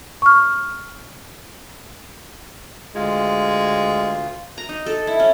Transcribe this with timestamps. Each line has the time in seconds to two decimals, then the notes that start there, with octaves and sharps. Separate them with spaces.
0.22 C#6 F6
2.95 D2 G#3 F4
4.58 A#5
4.69 D#4
4.86 A4
5.07 E4
5.20 C#4